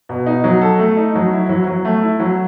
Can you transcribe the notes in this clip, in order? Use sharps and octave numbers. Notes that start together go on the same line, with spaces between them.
B2
D#4
F#3
A4
A3
D#4
F#3
E4
F#3
F#3
A3
E4
F#3